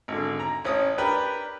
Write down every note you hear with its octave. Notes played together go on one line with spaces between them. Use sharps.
G#1 D3
A#5
A1 C#4 D#6
D4 G4 A#4 B4